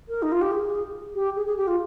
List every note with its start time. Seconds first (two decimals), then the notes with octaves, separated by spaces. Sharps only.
0.08 A#4
0.22 D#4
0.31 F4
0.41 G4
0.51 G#4
1.14 G4
1.35 G#4
1.46 G#4
1.57 G4
1.67 F4